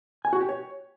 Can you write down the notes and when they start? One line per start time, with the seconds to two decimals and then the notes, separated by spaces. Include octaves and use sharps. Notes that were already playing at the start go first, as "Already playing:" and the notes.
0.25 G#5
0.33 F#4
0.41 G4
0.49 C#5